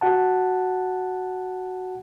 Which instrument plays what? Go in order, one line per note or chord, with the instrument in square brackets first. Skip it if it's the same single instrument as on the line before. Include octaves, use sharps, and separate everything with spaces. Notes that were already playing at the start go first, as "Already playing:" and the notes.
[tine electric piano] F#4 F#5 A5